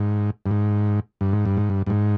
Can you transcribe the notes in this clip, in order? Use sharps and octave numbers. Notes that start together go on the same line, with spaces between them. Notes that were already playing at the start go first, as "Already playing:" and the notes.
Already playing: G#2
G2
G#2
G2
G#2
G2
G#2
G2
G2
G#2